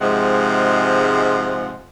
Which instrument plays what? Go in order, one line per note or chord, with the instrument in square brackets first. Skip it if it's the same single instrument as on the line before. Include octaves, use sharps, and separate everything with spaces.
[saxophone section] G#2 C3 F3 G#3 F#5